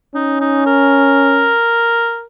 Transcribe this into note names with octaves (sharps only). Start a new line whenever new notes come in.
C#4 D#4
D#4
A#4